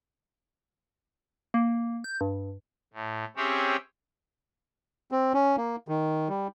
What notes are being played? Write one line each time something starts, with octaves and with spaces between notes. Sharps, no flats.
A#3
G6
G2
A2
C4 C#4 G4 G#4 C#5 E5
C4
C#4
A#3
D#3
G3